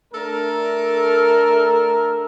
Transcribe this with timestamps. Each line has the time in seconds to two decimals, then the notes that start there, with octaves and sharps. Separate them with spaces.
0.14 A3 D4 A4 A#4